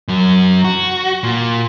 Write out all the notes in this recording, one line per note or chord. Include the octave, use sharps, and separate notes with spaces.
F#2 F#3
F#4
A#2